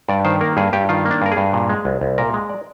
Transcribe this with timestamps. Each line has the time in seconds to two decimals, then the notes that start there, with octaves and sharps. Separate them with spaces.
0.08 G2 D5
0.25 D#3 C5
0.41 A#3 A#4
0.57 G2 G#4
0.73 G2 G4
0.89 D#3 F4
1.05 A#3
1.11 D4
1.22 G2 A#4
1.32 G#4
1.37 G2
1.53 A#2
1.69 G#3
1.85 C2
2.01 C2
2.18 A#2 A#4
2.34 G#3
2.50 D5